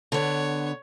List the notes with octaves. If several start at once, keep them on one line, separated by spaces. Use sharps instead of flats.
D3 B3 C#5